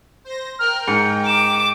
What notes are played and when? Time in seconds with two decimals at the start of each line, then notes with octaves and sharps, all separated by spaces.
0.25 C5 A#6
0.59 A#4 G5 F6
0.88 G#2 C#7
1.27 D6 E7